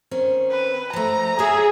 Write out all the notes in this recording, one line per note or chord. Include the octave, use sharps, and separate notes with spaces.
D#3 C4 C#4
B4
F3 A3 A#5
G#4 C#5 E5